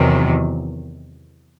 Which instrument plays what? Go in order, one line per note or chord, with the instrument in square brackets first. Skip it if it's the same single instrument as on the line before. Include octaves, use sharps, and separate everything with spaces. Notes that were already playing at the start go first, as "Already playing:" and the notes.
Already playing: [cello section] E2 C3 D#3 F#3